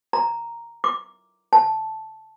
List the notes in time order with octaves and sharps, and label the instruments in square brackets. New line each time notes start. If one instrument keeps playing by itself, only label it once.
[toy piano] A#5
D6
A5